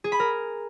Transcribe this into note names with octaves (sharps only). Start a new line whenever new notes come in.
G#4
B5
A#4